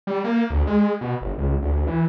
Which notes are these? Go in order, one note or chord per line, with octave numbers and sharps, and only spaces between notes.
G3
A#3
D2
G#3
B2
G1
C#2
D2
E3